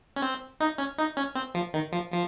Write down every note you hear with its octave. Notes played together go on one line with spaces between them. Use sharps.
C#4
C4
D#4
C#4
D#4
C#4
C4
F3
D#3
F3
F3